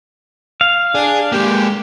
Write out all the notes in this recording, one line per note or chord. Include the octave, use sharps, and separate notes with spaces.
F5
D4 G#4
G#3 A#3 G4